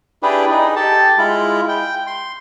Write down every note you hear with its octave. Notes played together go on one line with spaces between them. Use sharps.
D4 E4 G4 G#4 B4
D#4 G#4
G4 A4 A5
G#3 E4 F4
G5
C6